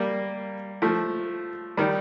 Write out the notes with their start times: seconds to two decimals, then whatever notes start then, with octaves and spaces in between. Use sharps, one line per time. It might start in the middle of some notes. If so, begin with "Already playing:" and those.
Already playing: G3 A#3
0.82 F3 A3
1.77 D#3 G3